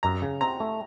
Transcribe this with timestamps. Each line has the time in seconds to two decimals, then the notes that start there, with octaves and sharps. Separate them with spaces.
0.03 F#2 A#5
0.22 C#3
0.41 C4 A#5
0.60 A3